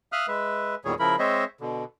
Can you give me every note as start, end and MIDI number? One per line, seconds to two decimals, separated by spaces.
0.12 0.26 76
0.12 0.26 77
0.12 0.26 87
0.12 0.26 89
0.12 0.26 90
0.28 0.75 56
0.28 0.75 71
0.28 0.75 76
0.85 0.94 40
0.85 0.94 46
0.85 0.94 51
0.85 0.94 55
0.85 0.94 68
0.85 0.94 73
0.99 1.16 49
0.99 1.16 53
0.99 1.16 64
0.99 1.16 70
0.99 1.16 83
1.19 1.44 56
1.19 1.44 60
1.19 1.44 72
1.19 1.44 73
1.19 1.44 75
1.19 1.44 76
1.61 1.84 47
1.61 1.84 50